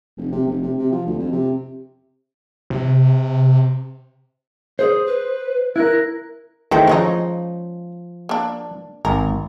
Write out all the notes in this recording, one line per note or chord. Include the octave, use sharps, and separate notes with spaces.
F1
C3
F1
C3
C3
F3
D2
F2
C3
C3
G#4 C5
B4
E4 A#4 F#6
D#3 E3 A3 G#4 C5 G5
F3 G#3 C#4 D#4
A#3 D4
G#1 A#4